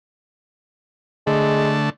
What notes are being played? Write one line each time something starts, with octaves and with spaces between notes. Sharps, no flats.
D3 G#3 A3